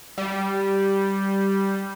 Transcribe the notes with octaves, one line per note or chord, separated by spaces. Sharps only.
G3